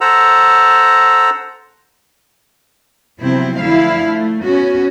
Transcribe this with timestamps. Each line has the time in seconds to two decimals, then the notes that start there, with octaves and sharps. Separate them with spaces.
0.01 A4 C5 F#5 A#5 E6
3.21 C3 F3 F#3 B3 C4 E4
3.60 D3 F3 A3 E4 F5
4.08 A3
4.43 B3 C#4 F#4